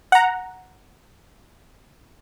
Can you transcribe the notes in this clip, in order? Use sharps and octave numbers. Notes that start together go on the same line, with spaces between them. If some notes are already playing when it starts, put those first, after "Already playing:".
F#5 A#5